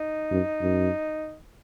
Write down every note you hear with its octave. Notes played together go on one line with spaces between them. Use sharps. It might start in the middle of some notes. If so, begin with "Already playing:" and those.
Already playing: D#4
F#2
F#2